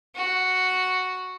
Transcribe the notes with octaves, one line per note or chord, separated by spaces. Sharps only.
F#4